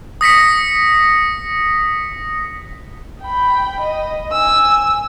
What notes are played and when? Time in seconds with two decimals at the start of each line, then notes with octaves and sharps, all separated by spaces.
0.21 D#6 A#6 B6 C#7
3.22 G5 B5
3.80 D#5
4.32 G#5 E6